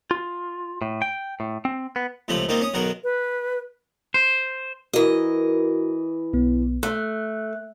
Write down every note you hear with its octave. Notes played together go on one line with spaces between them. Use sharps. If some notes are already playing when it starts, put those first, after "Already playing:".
F4
A2
G5
A2
C4
B3
C#2 C3 F3 A3 F4 B5
D#3 G3 A#3 C4 D#4 F4
C#4 D#6
B1 B2 D#3 F#4 A#4
B4
C5
E3 F#4 A#4 D#5
B1 B3
A3 F#6